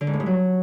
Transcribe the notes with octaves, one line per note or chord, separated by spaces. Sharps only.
D3
G#2
A2
G2
F#3